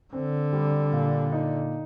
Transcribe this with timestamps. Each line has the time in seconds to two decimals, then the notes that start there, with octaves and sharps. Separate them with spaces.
0.13 D3 C4
0.53 G3
0.92 A#2
1.32 D#4